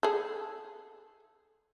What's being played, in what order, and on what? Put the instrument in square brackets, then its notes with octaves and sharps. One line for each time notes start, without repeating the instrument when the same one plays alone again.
[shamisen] G#4 A4